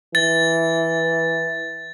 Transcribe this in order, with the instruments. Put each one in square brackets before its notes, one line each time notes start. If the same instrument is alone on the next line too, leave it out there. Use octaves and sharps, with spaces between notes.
[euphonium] E3 [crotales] A6